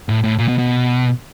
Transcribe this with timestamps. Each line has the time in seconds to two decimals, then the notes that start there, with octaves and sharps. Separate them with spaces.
0.09 A2
0.24 A2
0.39 A#2
0.48 B2
0.58 B2